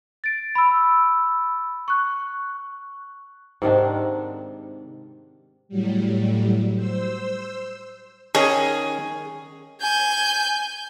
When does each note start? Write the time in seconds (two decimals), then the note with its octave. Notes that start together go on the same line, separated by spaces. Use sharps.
0.24 A6 D7
0.55 B5 E6
1.88 C#6 F#6
3.62 G#2 C3 D#3 D4
5.69 A2 F#3 G3
6.75 C5 E6
8.35 D#3 C#4 G#4 G#5
9.81 G#5 G6